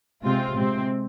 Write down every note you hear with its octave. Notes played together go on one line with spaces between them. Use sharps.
C3 G#3 C4 F4
C3 G#3 C4